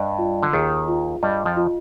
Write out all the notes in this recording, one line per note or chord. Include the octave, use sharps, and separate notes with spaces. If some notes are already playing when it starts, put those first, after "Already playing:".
Already playing: G2 D#5
F4
D3
D#2 D#3 G#4
F4
G2 G3 D#5
F2 F3
F4